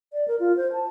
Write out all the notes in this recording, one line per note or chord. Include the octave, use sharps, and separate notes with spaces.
D5
A#4
F4
C5
A5